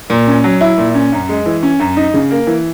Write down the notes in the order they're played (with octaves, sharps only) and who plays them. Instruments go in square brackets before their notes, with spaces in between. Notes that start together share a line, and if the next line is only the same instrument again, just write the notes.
[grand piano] A#2
C#4
F#3
E4
A#2
C#4
F#2
G#3
E3
C#4
F#2
D#4
C#3
A#3
E3